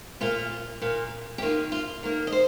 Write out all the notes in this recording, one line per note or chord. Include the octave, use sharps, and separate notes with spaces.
A#2 A#3 F4
A#2 A#3
G4
D#3 A#3 F4
F4
D#3 A#3 A#4
D#5
C5